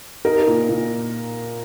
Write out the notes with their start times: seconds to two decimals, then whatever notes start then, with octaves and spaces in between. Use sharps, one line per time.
0.25 D#4 A#4
0.47 A#2
0.69 A#2